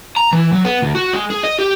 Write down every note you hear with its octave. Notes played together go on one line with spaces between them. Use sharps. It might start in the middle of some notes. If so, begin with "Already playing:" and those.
A#5
E3
F#3
B3
D2
F#4
G#3
G#4
D#5
G4